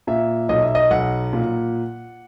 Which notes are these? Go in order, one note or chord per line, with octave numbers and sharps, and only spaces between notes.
A#2 E5
B1 D#5
E5
D#5
B1 F#5
A#2